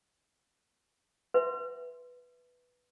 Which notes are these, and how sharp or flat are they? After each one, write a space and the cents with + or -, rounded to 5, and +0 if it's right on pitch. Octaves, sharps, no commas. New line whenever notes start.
B4 +0 E5 +0 C6 -5